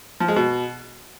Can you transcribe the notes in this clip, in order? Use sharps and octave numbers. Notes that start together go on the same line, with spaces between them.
F3
G#3
B2